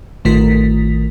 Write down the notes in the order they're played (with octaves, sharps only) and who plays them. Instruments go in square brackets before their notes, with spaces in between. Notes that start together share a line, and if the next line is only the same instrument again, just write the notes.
[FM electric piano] A1 D#3 A3 F4 A#4 B6